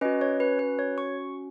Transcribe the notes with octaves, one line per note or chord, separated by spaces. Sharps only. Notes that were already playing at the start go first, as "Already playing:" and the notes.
C#4 F#4 B4 D#5
C#5
B4
B4
C#5
C#6